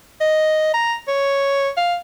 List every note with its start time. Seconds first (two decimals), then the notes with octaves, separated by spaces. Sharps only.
0.21 D#5
0.74 A#5
1.08 C#5
1.77 F5